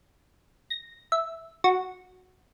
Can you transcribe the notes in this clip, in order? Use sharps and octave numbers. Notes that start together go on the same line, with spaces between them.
A#6
E5
F#4